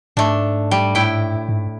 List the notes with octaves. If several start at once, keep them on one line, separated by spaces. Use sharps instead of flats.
G#2 A3 D4
G3
A2 E4 G5
G#2